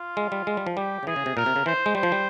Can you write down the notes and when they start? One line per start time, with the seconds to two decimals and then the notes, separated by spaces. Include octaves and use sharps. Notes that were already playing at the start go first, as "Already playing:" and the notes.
Already playing: F4
0.17 G#3
0.32 G3
0.47 G#3
0.57 G3
0.67 F3
0.77 G3 G4
1.03 C#3
1.07 E3 G#4
1.16 C#3
1.26 C3
1.37 A#2 A#4
1.46 C3
1.56 C#3
1.66 E3 C5
1.86 G#3
1.95 G3 C5
2.03 F3
2.12 G3